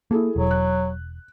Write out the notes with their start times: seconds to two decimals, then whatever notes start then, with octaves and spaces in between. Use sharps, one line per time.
0.11 A#3 E4 G#4 A4
0.36 E1 F#3
0.51 F#6